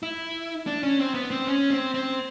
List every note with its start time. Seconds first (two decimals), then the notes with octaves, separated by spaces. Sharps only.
0.03 E4
0.67 D4
0.83 C#4
0.99 C4
1.14 B3
1.31 C4
1.47 C#4
1.71 C4
1.94 C4